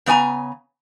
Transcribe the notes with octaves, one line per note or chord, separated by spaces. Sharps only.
C#3 B3 D5 G#5 A#5